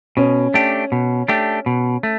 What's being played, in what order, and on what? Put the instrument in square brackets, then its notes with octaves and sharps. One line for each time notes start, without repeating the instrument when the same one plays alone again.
[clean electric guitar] B2 [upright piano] C#4
[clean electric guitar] A3 D4 G4
B2
A3 D4 G4
B2
A3